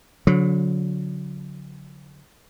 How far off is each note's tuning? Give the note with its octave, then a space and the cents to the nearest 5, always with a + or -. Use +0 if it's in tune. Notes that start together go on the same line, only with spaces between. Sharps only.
D3 -40 F#3 -30